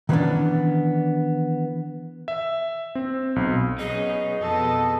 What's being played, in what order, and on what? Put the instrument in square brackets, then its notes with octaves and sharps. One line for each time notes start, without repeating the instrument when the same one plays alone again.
[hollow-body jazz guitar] D#3 E3 G3 B3 C#4 D4
[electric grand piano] E5
C4
B1
[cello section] F#3 B3 C#4 [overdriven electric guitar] D#4 [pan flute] G#4
[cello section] F2 B2 D#5 [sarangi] A4